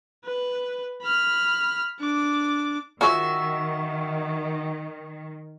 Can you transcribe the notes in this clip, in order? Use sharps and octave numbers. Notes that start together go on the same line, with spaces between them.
B4
B5 F6
D4 D6
D#3 F4 F#4 G#4 C#5 E5